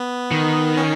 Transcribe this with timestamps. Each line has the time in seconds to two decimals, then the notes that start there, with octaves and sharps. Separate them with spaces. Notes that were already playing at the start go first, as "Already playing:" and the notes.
Already playing: B3
0.31 D#3
0.77 C#4